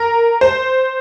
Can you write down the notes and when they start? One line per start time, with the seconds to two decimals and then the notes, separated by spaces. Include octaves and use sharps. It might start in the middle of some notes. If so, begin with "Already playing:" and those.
Already playing: A#4
0.41 C5